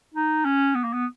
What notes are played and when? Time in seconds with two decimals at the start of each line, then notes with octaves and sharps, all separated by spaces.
0.14 D#4
0.45 C#4
0.75 B3
0.84 A#3
0.93 B3